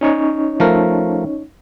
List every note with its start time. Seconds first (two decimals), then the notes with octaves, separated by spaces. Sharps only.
0.01 C#4 D#4 C#5
0.60 F3 A3 A#4